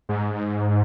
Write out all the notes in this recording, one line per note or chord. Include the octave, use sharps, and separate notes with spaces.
G#2